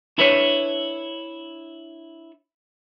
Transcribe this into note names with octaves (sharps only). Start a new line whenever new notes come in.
D4 E4 A4 B4 C#5